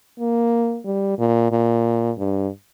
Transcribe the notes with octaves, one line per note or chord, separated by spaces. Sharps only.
A#3
G3
A#2
A#2
G2